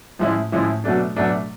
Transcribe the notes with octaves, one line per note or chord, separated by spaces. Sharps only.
A2 F3 G#3 C#4 E4
A2 F3 G#3 C#4 E4
B2 F#3 A3 D4
B2 F#3 A3 D4